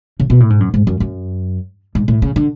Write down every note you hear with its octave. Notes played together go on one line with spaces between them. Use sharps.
C#3
B2
A2
G#2
F#2
G#2
F#2
F#2
G#2
A2
C#3
D3